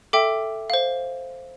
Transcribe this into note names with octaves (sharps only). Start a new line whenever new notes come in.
A4 E5 G5 D6
C5 F5